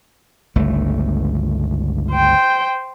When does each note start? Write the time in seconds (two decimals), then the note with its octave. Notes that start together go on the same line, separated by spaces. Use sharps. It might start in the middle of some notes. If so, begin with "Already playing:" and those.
0.56 G1 C#2 A3
2.12 C5 G5